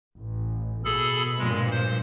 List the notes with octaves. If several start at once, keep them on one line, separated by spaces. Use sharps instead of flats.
A1
B2 G#4 A4 B5
G2 A#2 F3 G#3
C5